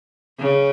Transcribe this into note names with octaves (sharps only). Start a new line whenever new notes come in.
C#3